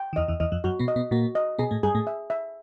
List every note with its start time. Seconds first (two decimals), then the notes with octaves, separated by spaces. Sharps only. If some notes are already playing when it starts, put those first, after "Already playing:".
Already playing: G5
0.13 D#3
0.16 E2 E3 D#5
0.28 E2 E3
0.40 E2 E3 D#5
0.52 F2 F3
0.64 F#2 F#3 F#4
0.79 B2 B3
0.88 D#5
0.96 B2 B3
1.11 A#2 A#3 F#4
1.35 D#5
1.59 B2 B3 G#4
1.71 A2 A3
1.83 G2 G3 G#4
1.95 A2 A3
2.07 E5
2.30 E5